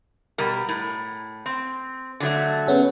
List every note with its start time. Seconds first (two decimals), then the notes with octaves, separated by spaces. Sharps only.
0.38 B2 G3 A#4
0.69 A2
1.46 C4
2.20 D3 F#3 A3
2.67 B3 C#4 G#4